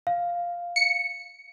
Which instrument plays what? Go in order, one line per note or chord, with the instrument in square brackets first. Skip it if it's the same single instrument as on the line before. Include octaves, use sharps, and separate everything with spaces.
[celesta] F5
[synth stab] C#7